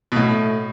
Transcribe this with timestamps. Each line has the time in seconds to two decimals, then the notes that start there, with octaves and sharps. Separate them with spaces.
0.12 B2
0.16 A2 A3